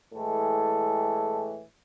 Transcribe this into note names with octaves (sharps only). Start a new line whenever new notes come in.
A2 E3 G#3 A4